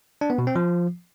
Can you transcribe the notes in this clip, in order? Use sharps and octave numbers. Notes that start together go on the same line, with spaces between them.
D4
B3
B2
C4
F3